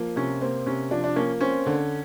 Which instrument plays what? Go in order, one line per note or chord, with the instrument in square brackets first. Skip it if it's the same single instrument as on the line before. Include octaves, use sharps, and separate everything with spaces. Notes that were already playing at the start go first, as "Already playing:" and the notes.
Already playing: [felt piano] F3 A#3
C3 C#4
A#3 C4
C3 C#4
F3 D4
D4
A#3 C#4
C4 C#4
D3